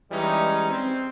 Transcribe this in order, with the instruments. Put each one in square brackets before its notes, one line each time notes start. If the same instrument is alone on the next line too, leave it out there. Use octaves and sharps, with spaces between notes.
[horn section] E3 G3 G#3 C#4 D#4
C4